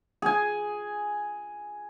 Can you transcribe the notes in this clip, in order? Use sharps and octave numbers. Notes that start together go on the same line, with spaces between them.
G#4 G#5